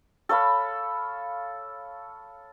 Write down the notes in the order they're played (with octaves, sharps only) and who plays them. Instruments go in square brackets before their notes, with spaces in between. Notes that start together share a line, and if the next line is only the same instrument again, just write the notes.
[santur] A4 C#5 F5 B5